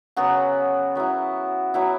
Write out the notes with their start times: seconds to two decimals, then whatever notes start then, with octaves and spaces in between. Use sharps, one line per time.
0.16 C#3 F#3 B3 F#4
0.95 F#3 B3 E4
1.74 F#3 B3 E4